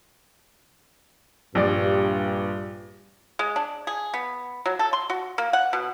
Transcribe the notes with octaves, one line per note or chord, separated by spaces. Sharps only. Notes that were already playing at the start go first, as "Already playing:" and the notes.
A#1 G2 D5
G#3
D4
G#4
B3
F#3
A4
C6
F#4
A#3
F#5
B2